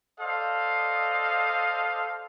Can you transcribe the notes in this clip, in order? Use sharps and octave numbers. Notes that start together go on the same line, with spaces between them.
A4 C5 D5 D#5 F5